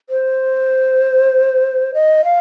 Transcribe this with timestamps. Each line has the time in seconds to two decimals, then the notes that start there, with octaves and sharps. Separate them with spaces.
0.10 C5
1.94 D#5
2.25 F5